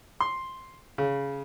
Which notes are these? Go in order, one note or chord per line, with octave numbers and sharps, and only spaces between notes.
C6
C#3